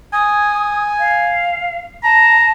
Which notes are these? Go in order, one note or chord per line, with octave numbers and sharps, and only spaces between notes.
G#5 D#6
F5
A5 A#5